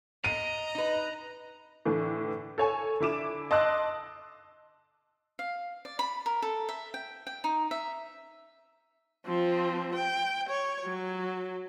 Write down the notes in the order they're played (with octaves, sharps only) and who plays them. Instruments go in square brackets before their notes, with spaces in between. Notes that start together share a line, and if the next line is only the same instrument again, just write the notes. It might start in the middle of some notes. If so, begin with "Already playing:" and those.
[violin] D#5 [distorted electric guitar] A#5 [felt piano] D#7
[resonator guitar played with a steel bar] D#4 B4
[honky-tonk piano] A2 D3 E3
A4 C#5 G#5
D3 E4 D6 E7
D#5 A5 C6 D6 E6 F#6
[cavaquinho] F5
D5
B5
A#4
A4
E5
G5
G5
D#4
E5
[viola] F3 C4
G5
C#5
F#3